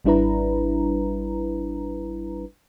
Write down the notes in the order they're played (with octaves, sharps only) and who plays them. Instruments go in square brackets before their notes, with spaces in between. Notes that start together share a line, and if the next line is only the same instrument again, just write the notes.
[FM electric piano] G#1 G3 D4 E4 B4 A#5